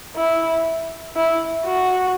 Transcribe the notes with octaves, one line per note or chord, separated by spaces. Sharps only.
E4
E4
F#4